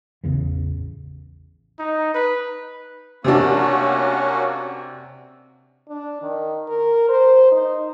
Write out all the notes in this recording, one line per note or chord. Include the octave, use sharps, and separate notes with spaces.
A1 E2 C#3 E3
D#4
B4
C3 A#3 C#4 D4 F#4
D4
D#3
A#4
C5
D#4